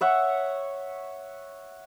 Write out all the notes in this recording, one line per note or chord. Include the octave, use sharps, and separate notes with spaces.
C#5 E5 F#5 C#6